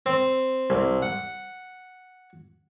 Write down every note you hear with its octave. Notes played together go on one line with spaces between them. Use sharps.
C4
C2
F#5